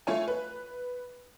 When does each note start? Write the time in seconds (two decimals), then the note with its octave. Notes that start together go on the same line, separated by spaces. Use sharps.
0.07 A3 F4 C#5 G#5
0.28 B4